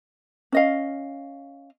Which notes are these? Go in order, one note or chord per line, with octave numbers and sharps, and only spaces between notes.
C#4 D#5 F5